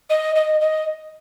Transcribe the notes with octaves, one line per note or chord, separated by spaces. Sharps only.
D#5
D#5
D#5